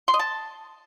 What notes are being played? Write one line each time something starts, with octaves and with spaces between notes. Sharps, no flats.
C6
D#5
A5